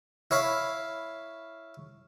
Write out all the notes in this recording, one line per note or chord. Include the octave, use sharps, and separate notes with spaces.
E4 C#5 F5 B5